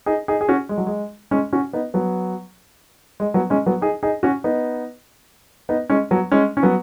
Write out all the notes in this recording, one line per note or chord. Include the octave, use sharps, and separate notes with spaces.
D#4 G#4
D#4 G#4
G#4
C#4 F#4
G#3
F#3
G#3
G#3 C#4
C#4 F#4
B3 D#4
F#3 B3
G#3
F#3 B3
G#3 C#4
F#3 B3
D#4 G#4
D#4 G#4
C#4 F#4
B3 D#4
B3 D#4
G#3 C#4
F#3 B3
G#3 C#4
C#4
F#3 B3